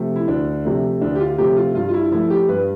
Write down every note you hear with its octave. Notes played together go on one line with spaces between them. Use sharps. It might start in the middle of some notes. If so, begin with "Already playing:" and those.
Already playing: C3 F3 A3
E4
D2 D4
C3 F3 A3
D2 D4
G4
F4
C3 F3 A3 G4
F4
G2 F4
F4
E4
F3 A3 E4
G4
G2 B4